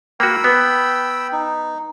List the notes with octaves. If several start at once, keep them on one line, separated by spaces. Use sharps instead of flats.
A#3 F#4 G5 B5 E6
B3
D#4